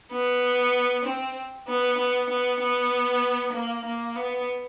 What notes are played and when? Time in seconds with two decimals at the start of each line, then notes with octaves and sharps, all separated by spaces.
0.12 B3
1.05 C4
1.68 B3
1.98 B3
2.29 B3
2.61 B3
3.53 A#3
3.85 A#3
4.15 B3